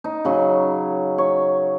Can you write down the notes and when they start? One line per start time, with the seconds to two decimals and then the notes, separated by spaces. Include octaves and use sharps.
0.04 D#4
0.25 C#3 F#3
1.18 C#5